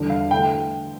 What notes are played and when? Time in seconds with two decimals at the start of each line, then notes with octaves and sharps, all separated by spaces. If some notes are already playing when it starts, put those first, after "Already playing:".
Already playing: E2 D3 G3 D4
0.10 F5
0.31 D3 A3 G5